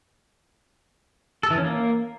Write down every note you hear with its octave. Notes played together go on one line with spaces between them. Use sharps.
A4
E3
C#4
A#3